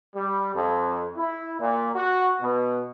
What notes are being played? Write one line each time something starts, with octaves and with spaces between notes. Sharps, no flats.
G3
F2
E4
A#2
F#4
B2